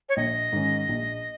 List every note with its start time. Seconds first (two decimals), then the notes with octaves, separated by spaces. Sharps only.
0.09 C#5
0.17 A#1 D#5
0.52 G#2 D#3 C#4
0.88 A#1